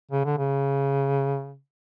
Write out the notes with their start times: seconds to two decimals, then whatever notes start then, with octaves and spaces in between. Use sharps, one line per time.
0.11 C#3
0.25 D3
0.38 C#3